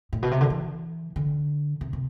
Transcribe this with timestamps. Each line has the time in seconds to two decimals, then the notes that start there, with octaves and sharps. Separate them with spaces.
0.13 A2
0.23 B2
0.31 C3
0.41 D3
0.50 E3
1.16 D3
1.81 C3
1.93 C3